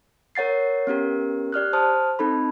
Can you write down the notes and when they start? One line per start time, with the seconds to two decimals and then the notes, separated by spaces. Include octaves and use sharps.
0.35 A#4 C#5 F#5 A6 C7
0.87 B3 C#4 G4 A#4
1.52 G4 D5 F6 F#6
1.73 C5 A5 D#6 F6
2.19 C4 D#4 A4 B5